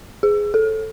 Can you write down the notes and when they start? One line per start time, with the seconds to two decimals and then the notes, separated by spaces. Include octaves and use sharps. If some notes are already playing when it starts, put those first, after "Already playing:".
0.23 G#4
0.54 A4